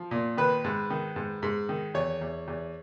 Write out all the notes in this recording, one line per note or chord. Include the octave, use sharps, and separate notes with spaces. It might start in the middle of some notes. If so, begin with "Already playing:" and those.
Already playing: F3
A#2
D#3 B4
G#2
D#3
G#2
G#2
D#3
E2 C#5
E2
E2